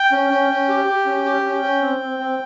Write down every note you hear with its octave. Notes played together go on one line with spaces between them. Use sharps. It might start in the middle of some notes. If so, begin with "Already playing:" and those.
Already playing: G5
C#4
C#4
C#4
G4
G4
C#4
G4
C#4
C#4
C4
C4
C4